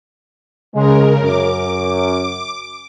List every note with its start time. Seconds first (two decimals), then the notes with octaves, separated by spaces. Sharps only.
0.74 C#3 G#3 A#4
1.23 F#2 D6